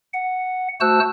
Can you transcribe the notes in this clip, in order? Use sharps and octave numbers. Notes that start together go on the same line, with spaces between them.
F#5
A3 F#4 C5 A5 E6 F#6